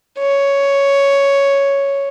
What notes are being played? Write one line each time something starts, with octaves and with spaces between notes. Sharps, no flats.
C#5